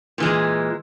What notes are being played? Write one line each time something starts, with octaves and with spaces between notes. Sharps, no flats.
A#2 E3 G#3